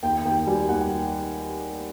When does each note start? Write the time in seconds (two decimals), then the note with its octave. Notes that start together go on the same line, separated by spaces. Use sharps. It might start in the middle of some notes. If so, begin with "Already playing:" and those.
0.03 D#2 G5
0.25 D#2 G5
0.47 G3 G#5
0.69 D#2 F#5